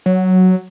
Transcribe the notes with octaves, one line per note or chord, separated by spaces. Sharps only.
F#3